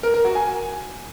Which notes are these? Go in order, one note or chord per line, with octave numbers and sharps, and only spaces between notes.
A#4
A#4
F#4
G#5